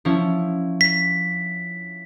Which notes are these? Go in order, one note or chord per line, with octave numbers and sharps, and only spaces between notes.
F3 C#4 E4
B6